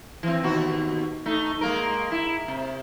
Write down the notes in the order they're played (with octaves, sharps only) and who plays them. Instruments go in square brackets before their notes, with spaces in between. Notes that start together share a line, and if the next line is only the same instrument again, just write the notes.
[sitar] E3 C4
D#2 B2 F#4
A3 D#4
G#3 A#3 A#4
E4
C3